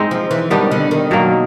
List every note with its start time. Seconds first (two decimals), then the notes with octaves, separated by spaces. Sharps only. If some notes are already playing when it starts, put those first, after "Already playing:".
Already playing: G#3 C4 D#4
0.11 F3
0.31 E3
0.50 D#3 G3 B3 D4 G4
0.71 D3
0.91 D#3
1.11 B2 F#3 A#3